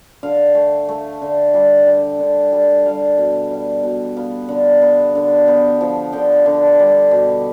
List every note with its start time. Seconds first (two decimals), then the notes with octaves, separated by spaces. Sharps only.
0.23 D3 F5
0.55 A3
0.89 A3
1.22 D3
1.53 G3 E5
1.87 G3
2.20 D3
2.52 G3
2.85 G3 F5
3.18 B2
3.51 G3
3.83 B2
4.17 B3 F5
4.49 D3
4.81 B3
5.15 D3
5.47 B3 G5
5.81 F3
6.12 D3 G5
6.46 D3
6.79 G3
7.11 B2